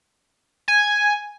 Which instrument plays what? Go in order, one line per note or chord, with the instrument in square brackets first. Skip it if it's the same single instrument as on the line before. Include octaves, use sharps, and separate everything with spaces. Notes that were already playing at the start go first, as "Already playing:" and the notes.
[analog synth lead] G#5